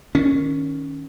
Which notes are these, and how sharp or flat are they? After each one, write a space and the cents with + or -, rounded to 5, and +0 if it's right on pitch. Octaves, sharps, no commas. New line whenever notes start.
D#3 +0 C#4 +0